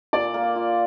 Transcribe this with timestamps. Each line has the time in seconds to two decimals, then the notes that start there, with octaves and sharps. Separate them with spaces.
0.13 A#2 D5
0.34 A#3
0.56 F4